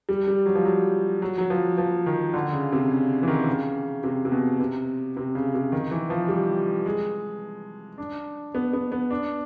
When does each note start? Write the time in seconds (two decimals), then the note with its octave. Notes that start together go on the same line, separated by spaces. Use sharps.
0.09 G3
0.28 G3
0.46 F#3
0.55 F3
0.65 F#3
1.22 F#3
1.38 F#3
1.50 F3
1.78 F3
2.06 D#3
2.34 D3
2.53 C#3
2.72 C3
2.90 C#3
3.23 E3
3.28 D#3
3.47 C#3
4.04 C3
4.25 C3
4.32 B2
4.60 C3
5.17 C3
5.35 C#3
5.54 C3
5.72 D#3
5.91 E3
6.10 F3
6.28 G3
6.86 G#3
7.98 D4
8.55 B3
8.73 B3
8.92 B3
9.11 D4